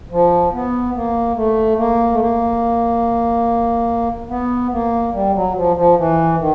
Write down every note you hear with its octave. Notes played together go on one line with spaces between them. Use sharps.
F3
B3
A#3
A3
A#3
A3
A#3
B3
A#3
G3
F#3
F3
F3
E3
D#3